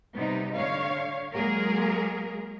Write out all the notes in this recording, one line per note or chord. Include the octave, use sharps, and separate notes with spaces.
C3 G3 B3 D#4
D3 C#5 F5
F#3 G#3 A#3 G#4 A#4